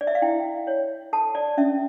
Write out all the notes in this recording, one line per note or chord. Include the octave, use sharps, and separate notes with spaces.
D5
E5
F5
E4 G5
C#5
A4 A5
D5
C#4 E5